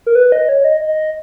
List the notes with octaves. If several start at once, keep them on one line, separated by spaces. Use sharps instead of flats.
A#4
B4
D#5
C#5
D#5
D#5